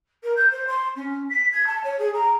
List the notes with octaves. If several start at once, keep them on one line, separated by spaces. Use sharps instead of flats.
A#4
G6
C5
C6
C#4
B6
G#6
A5
C#5
G#4
A#5